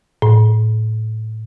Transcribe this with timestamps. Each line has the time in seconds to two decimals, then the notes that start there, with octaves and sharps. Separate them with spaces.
0.22 A2